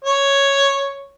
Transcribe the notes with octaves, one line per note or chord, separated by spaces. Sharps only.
C#5